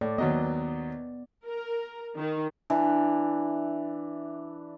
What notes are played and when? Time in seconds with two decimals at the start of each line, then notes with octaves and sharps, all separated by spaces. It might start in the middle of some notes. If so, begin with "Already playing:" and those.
0.01 A2 D5
0.18 D#2 F#3 B3 D#5
1.46 A#4
2.16 D#3
2.70 E3 D4